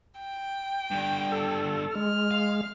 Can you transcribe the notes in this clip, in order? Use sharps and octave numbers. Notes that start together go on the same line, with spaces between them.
G5
G2 D3
A4
G#3 F6
F5